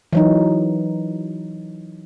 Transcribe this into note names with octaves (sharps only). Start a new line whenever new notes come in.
E3 F#3 D#4